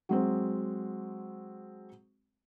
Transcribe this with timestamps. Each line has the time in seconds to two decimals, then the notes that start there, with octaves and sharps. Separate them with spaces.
0.09 F#3 G#3 C4